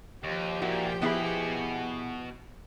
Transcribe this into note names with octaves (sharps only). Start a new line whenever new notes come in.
D#2 F3 G4
A#2 E4 F#4
B2 B3 E4 G#4 B5